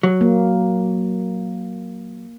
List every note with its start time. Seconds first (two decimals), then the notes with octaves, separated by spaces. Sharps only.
0.03 F#3
0.21 A#3